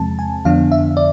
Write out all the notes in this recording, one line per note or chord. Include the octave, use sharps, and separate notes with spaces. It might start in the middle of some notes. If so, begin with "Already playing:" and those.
Already playing: E2 C3 F3 G#3 C4 A5
G#5
F2 D3 F3 B3 D4 F5
E5
D5